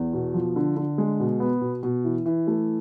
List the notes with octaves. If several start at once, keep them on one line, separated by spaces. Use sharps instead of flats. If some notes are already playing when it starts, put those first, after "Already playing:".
Already playing: E2
B2
F3
D3
D3
G#3
B2
B3
B2
B2
E3
E3
A3